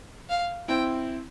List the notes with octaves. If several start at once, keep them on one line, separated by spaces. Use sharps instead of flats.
F5
C4 E4 G5